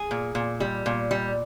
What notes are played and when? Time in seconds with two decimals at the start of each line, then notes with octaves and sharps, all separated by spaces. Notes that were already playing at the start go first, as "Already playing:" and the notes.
Already playing: G#4
0.11 A#2
0.35 A#2
0.60 G3
0.86 A#2
1.11 G3